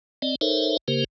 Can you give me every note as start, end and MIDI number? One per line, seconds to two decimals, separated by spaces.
0.22 0.35 60
0.22 0.35 74
0.22 0.35 75
0.41 0.77 63
0.41 0.77 69
0.41 0.77 70
0.41 0.77 72
0.41 0.77 73
0.41 0.77 76
0.88 1.04 49
0.88 1.04 58
0.88 1.04 67
0.88 1.04 70
0.88 1.04 72